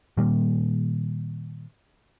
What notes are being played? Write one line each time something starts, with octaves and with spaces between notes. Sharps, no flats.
A#2 D#3 G3 A#3